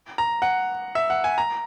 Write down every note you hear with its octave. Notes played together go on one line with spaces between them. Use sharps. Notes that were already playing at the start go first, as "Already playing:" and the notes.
A#5
F#5
E5
F#5
G#5
A#5